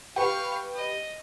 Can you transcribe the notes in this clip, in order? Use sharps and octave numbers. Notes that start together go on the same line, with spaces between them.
G4 B4 F5 C#6
D#5